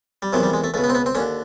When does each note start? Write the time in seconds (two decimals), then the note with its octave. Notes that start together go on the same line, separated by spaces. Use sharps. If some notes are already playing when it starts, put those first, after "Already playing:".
0.22 G3
0.33 E2 C3 D#3 F#3
0.43 G3
0.54 G#3
0.64 A3
0.74 C#2 A3
0.78 B2
0.84 B3
0.89 C4
0.95 B3
1.06 C4
1.15 D#2 D3 C#4